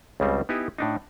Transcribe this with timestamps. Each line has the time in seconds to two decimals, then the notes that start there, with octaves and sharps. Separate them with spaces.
0.20 C#2 C#3 G3 C4
0.49 B3 D#4 E4 G4 G#5
0.78 A2 D4 D#4